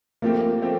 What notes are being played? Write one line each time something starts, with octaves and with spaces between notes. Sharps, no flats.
F3 A3 A#3 C4 G4
F3 A3 C4 G4